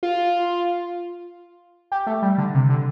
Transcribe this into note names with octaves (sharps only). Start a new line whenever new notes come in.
F4
G4
A3
G3
D3
C3
D3